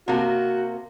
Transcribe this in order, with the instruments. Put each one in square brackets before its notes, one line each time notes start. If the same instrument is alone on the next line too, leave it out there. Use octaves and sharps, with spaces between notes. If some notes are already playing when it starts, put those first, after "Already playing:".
[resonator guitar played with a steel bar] C3 A#3 [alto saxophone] F#4